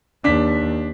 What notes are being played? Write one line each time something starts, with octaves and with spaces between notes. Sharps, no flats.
D#2 D4 B6